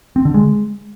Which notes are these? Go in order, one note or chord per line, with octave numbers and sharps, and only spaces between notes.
C4
D3
G#3